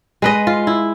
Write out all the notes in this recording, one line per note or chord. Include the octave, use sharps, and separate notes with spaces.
G#3 B4 D#5
F4
E4